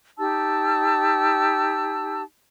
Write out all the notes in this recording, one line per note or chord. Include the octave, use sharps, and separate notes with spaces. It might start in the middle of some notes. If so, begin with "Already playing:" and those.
D#4 G4 A5 E6